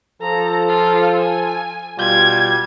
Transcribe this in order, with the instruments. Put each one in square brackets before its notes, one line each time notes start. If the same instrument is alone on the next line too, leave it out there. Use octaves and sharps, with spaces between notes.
[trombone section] F3 A4 [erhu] A#5
[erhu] F4
G#5
[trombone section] B2 G3 F4 [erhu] G#6